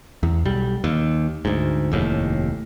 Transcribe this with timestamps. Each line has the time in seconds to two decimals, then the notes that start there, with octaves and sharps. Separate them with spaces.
0.23 E2
0.45 B1 G3
0.84 D#2
1.45 D2 G#2
1.92 F1 D#2 A2